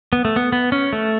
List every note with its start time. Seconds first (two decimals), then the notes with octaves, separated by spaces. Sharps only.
0.13 B3
0.25 A3
0.36 B3
0.52 B3
0.72 C#4
0.93 A3